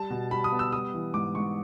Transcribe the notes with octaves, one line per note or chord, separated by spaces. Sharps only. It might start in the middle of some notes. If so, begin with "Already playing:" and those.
Already playing: G3 A5
B2
G3 B5
D#6
B3
E6
G3 D#6
E3
G#2 D6
G#2 C#6